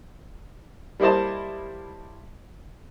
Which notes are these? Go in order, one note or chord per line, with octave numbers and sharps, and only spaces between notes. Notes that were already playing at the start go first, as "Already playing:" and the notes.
G3 A#3 E4 C5 D#5 A5